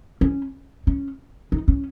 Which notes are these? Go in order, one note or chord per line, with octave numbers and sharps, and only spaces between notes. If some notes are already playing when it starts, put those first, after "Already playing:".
C#4
C#4
D#4
C#4